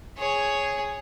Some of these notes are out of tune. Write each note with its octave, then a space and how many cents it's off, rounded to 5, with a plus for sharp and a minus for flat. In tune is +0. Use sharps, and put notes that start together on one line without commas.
G#4 +0 C#5 +0